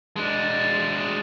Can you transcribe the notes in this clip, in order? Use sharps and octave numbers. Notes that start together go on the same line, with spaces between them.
G#3 D4